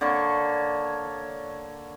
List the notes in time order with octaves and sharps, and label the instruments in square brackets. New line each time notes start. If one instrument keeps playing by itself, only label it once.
[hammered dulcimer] D3 A#3 C#5 C#6